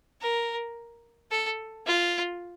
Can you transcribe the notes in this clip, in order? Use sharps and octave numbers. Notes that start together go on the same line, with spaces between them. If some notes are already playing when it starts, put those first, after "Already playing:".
A#4
A4
F4